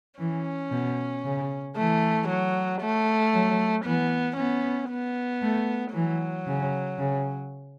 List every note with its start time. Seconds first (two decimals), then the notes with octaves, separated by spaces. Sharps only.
0.19 E3 C#4
0.71 B2
1.24 C#3
1.76 E3 A3
2.28 F#3
2.81 A3
3.34 F#3
3.85 E3 B3
4.37 B3 C#4
4.90 B3
5.42 A3
5.94 E3 F#3
6.47 C#3
6.98 C#3